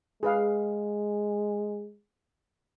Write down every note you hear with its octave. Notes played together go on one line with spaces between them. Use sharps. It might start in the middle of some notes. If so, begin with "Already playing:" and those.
G#3 G#4 B4 F5